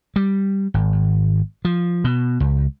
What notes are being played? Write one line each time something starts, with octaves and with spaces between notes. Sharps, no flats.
G3
G#1
F3
B2
C#2